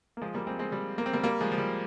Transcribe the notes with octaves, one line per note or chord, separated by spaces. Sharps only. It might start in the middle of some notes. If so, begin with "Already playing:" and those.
A#3
F3 G#3
G3 A#3
G#3 C4
G#3 C4
G3
A#3
C4
G3 A#3
G3 A#3
F3 G#3
F3
G3